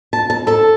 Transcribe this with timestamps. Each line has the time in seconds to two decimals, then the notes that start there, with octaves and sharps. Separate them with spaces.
0.13 A5
0.30 A5
0.47 A4 A5